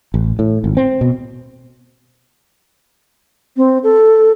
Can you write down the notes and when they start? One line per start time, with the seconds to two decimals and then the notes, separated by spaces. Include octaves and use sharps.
0.14 A1
0.39 A2
0.64 G#1
0.77 C4
1.01 B2
3.57 C4
3.83 A4